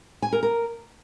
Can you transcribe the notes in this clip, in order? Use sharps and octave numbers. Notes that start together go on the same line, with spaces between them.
G#5
A#4
A#4